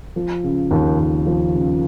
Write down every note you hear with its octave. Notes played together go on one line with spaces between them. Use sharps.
F3
C#3
D#2
D#2
F3
C#3